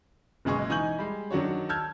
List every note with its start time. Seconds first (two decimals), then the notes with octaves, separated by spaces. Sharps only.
0.45 F#1 B2 G#3 G#4 C#6
0.69 E3 D#4 G#5 C#6 G6 F#7
0.98 G3 G#3
1.31 D#3 F#3 D4 F#4 C#5
1.69 A5 E6 F6 G6 G#6